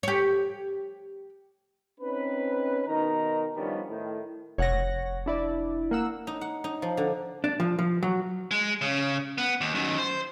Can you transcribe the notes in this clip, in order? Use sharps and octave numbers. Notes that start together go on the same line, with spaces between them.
G4 C#5
C4 C#4 D#4 B4
B2 D#3 D#4 A#5
G2 D#3 F3 G3 B3 C#4
A2 D#3
F1 C#5 F#5 A#6
D4 E4 D5
A#3 F#5 E6
D#4
F#5
D#4
F3
D3
D4
F3
F3
F#3
G#3
C#3
B3
D#2
F#2 D#3
C5